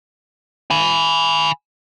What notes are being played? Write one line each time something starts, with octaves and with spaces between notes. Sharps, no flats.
G#5 B5